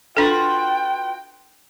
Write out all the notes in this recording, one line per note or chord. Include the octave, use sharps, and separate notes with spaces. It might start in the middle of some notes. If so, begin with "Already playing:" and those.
D4 F4 F#4 A4 B4 G5